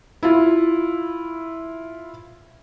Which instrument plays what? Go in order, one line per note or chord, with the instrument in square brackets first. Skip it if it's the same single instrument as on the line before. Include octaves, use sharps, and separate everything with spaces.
[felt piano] E4 F4